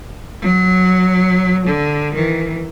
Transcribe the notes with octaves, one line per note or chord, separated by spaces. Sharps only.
F#3
D3
D#3 E3